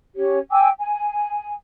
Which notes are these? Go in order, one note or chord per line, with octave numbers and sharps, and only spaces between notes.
C#4 G4 C#5
G5 G#5 D6 E6
G#5